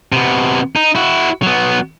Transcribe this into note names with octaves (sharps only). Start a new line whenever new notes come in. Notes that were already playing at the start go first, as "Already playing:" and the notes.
C3 B3
D#4
E4 F#4
F#3 B3